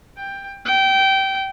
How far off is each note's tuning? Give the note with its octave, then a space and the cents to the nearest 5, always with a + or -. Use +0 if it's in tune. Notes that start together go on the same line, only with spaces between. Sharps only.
G5 +10
G5 -20